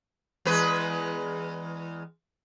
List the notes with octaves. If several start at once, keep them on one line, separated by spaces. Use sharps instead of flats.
E2 G#3 B4